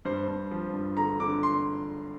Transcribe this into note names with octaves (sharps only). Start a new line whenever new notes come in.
G2 C5
G2
F3
G2
D3 A#5
D3 D6
C6